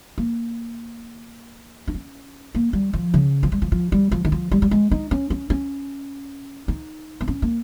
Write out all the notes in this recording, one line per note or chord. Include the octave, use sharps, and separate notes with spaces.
A#3
D#4
C#4
A#3
G3
F3
C#3
F3
G3
F3
F3
G3
F3
D#3
F3
G3
G3
G#3
D#4
C#4
C#4
C#4
D#4
C4
C#4
A#3